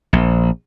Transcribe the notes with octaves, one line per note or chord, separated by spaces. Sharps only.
A#1